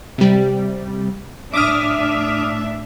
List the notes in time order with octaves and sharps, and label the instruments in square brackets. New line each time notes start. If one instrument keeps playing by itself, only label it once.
[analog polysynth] C3 G3
[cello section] A2 D4 E5 [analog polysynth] D6 D#6 F6